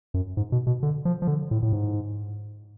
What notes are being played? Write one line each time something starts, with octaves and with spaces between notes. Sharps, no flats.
F#2
G#2
B2
B2
D3
F3
F3
D3
A2
A2
G#2